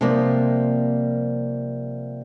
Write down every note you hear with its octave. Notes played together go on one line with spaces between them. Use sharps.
C3 F3 G3 A#3